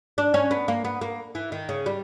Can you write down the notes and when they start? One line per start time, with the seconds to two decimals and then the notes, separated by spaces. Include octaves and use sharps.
0.18 D4
0.34 C#4
0.51 B3
0.68 A#3
0.85 B3
1.01 A#3
1.35 E3
1.52 D#3
1.69 C#3
1.86 G3